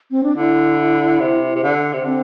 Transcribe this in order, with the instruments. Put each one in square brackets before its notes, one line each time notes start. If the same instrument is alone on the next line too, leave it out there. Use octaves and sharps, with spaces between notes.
[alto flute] C4
D4
[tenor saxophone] D3 [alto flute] E4
[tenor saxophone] C3
C3
D3
C3
[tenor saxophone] D3 [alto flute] C4